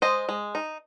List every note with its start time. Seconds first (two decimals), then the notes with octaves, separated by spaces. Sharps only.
0.02 G#3 C5 D#5
0.29 G#3
0.55 D#4